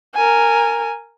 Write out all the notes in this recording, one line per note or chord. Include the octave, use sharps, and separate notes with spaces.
A#4 G#5